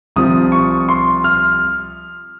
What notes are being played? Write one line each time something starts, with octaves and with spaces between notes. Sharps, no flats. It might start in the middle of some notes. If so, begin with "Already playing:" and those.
C2 C3 F3 D#6
C#6
C6
F6